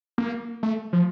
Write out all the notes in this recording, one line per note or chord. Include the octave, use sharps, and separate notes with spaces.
A#3
A3
F3